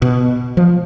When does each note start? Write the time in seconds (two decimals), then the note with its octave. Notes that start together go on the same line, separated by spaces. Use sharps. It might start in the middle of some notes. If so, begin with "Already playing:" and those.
0.02 B2
0.57 F3